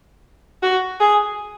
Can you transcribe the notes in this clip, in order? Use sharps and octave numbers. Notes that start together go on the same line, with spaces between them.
F#4
G#4